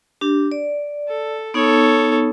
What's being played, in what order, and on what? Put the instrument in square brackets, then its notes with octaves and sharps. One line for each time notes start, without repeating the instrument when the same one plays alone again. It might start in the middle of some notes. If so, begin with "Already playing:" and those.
[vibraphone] D4 G4
D5
[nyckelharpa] A4
[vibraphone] B3 D#4 [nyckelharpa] A4 C#5